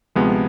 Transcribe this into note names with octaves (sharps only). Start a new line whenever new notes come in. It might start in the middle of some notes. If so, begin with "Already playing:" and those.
D2 C3 F3 G#3 B3